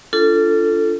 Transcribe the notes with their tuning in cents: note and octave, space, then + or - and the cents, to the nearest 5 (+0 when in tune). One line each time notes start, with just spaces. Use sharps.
D4 -30 F4 -25 A4 +5